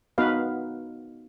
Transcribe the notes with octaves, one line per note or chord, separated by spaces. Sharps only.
B3 D#4 F#4 B4 F5